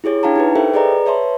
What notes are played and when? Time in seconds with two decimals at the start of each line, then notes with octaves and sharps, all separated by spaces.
0.04 E4 G4 G#4 C#5
0.23 D4 E4 F5 G5 A5 A#5
0.36 D#4 G4 B4
0.56 G4 A4 A#4 C5 E5 G5
0.74 G#4 B4 D5 D#5 A#5
1.06 B4 C#5 E5 A5 C6